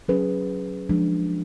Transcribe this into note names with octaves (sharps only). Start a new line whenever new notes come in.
F#3 C#4 G#4 B4
F3 G#3 D4